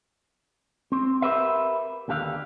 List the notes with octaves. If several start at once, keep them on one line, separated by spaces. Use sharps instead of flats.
C4
G4 A#4 B4 E5
D#2 D3 G4 F5